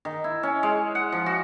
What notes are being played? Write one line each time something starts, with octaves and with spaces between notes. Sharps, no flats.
D#3
E4
C#4
G#3
F#5
F3
F#4